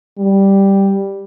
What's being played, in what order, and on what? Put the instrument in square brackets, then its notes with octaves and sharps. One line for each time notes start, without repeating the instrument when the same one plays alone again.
[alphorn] G3